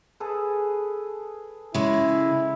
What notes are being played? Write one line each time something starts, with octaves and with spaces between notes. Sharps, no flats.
G#4 A4 B4
C#3 G#3 E4